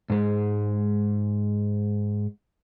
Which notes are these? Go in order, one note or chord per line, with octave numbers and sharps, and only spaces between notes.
G#2 G#3